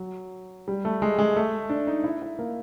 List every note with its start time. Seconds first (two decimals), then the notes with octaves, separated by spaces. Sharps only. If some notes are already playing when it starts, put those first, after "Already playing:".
Already playing: F#3
0.68 G3
0.85 A3
1.02 G#3
1.19 G#3
1.36 A3
1.70 D4
1.87 D#4
2.04 E4
2.22 E4
2.39 A#3